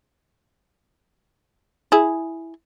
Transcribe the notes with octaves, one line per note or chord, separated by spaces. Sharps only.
E4 G#4